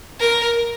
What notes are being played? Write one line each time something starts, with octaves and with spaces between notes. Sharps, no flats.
A#4